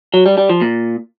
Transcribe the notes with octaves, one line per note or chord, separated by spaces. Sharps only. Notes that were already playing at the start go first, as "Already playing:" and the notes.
F#3
G3
G3
F3
A#2